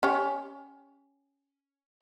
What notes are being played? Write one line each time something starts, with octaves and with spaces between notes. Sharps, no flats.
C#4 G4 C#5